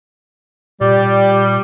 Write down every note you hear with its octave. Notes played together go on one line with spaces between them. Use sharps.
A#2 G3 G4 D5